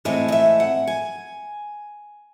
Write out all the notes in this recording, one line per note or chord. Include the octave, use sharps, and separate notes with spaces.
A2 E3 G#3 C4 D#5
D#5
E5
F#5
G#5